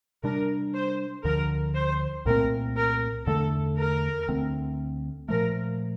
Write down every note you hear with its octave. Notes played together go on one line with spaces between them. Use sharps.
C3 G3 D4 A#4
C5
D2 D3 F3 A#4
C5
C2 A#2 A3 C4 A#4
A#4
E2 D3 A3 A4
A#4
D2 D3 A3 C4
A#2 F3 A3 A#4